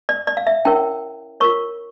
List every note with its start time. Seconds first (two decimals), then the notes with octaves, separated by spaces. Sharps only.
0.09 D5
0.27 D5
0.37 F5
0.47 E5
0.65 C#4 E4 A#4 C#5 G5
1.40 F4 A#4 C#5 C#6